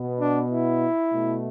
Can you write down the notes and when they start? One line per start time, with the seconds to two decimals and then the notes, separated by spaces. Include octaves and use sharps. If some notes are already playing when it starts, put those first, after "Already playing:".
Already playing: B2 B3
0.20 D4
0.50 E4
1.13 B2 A3